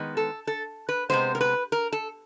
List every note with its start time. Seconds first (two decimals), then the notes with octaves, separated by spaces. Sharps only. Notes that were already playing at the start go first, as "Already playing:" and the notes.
Already playing: D#3 G#3 B3
0.17 A4
0.47 A4
0.89 B4
1.09 C3 E3 G#3 B3 C5
1.35 A#4
1.41 B4
1.72 A#4
1.92 A4